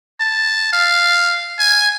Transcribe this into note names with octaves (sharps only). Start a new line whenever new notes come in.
A5
F5
G#5